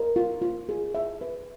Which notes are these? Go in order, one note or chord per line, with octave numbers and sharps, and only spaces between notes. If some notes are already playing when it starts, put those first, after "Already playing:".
Already playing: A#4
F4
F4
G#4
E5
B4